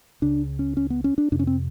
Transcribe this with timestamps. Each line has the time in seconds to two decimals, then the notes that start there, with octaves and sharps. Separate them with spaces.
0.22 C#2 C#3 D4
0.59 C#4
0.77 C#4
0.90 B3
1.04 C#4
1.18 D4
1.32 F2 C3 D4
1.39 C#4
1.47 C4